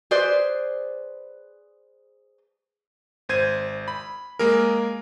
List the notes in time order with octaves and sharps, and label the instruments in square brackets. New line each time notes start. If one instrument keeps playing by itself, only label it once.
[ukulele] G#4 B4 C5 D5
[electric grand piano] G#1 C5 G#6 D#7
B5
G#3 A#3 G#4 A#4